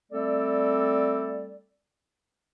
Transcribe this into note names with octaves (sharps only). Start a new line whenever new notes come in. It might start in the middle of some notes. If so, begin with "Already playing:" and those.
G3 A3 C4 A4 D5